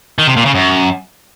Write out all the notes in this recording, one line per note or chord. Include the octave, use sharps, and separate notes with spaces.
D#3
C3
A#2
C#3
F#2